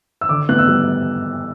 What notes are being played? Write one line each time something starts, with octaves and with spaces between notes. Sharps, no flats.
E6
D3 D6
B3 F#6
E6
G3